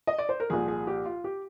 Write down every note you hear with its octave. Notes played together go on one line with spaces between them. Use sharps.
D#5
D5
C5
A#4
C2 A#2 F3 G#4
G#4
G4
F4
G4